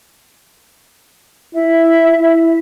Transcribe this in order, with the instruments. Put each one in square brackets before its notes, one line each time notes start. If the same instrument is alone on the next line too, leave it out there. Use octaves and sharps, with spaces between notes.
[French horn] E4 [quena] E5
[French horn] E4